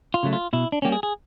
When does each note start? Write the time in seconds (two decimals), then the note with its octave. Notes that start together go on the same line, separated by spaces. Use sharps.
0.14 F4
0.23 C#3 F#3 A3
0.33 F4
0.53 B2 E4
0.72 D4
0.82 G3 A#3 C#4 G4
0.92 G#4
1.03 G#4